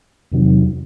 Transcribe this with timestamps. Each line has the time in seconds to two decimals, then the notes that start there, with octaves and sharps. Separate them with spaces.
0.32 E2 C3 D#3 F#3